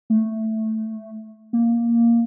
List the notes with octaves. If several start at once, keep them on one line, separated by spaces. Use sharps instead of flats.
A3
A#3